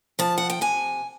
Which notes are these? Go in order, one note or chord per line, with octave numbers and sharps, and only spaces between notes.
F3 A5
F#5
G5
C3 G#5